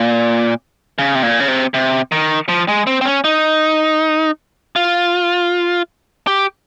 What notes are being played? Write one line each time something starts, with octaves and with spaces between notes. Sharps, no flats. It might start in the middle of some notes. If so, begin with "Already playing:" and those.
Already playing: A#2
C#3
C3
A#2
C#3
C3
C3
D#3
F3
G#3
C4
C4
C#4
D#4
F4
G4